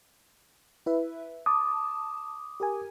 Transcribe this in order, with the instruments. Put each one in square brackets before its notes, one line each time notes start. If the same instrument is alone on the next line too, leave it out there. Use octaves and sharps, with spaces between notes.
[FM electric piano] E4 B4 E5
[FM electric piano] A5 [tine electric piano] D6 D#6
[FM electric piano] G4 A#4 G#5